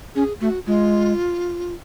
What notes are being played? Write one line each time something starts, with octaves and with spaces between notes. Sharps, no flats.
C#4 G#4
A3 F#4
G#3 F4